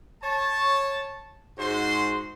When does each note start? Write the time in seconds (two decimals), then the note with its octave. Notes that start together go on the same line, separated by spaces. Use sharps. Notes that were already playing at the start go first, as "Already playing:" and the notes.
0.23 C#5 A5
1.58 G#2 G#3 F#4 C5 C6